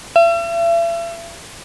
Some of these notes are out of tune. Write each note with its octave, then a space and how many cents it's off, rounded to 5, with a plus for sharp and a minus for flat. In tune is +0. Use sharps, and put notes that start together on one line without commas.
E5 +40